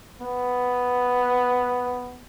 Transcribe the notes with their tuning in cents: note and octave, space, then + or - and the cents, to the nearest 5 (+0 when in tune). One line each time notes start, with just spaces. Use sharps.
B3 +5